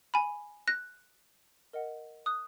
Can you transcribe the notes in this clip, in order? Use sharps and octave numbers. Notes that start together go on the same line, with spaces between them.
G#5 B5
F#6 A#6
A#4 D#5 F#5
D#6 F#6